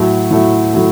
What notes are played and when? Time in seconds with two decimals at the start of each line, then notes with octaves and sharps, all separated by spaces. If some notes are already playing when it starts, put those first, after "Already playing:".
Already playing: A2 F#3 A3
0.31 A2 F#3 A3
0.73 A2 F#3 A3